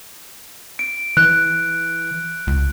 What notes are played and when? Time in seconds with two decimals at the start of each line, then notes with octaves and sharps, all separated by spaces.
0.79 D7
1.17 E3 F#6
2.47 C#2